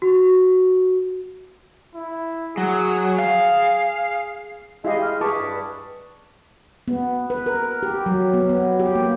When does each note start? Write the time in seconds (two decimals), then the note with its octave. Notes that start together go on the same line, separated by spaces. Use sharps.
0.02 F#4
1.95 E4
2.57 F#3 G#4
3.18 F5
4.85 G#3 E4 G4 D#5 F5
5.02 F6
5.21 G#4 B4 A5 C#6 D6
5.39 G2
6.88 B3
7.30 B4
7.46 A#4
7.83 G4
8.06 F#3
8.34 B3
8.49 B3
8.80 G4
8.96 A#3